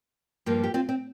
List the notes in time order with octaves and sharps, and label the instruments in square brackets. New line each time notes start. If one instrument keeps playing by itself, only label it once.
[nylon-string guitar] G2 F3 A#3
G4
C4 F4
C4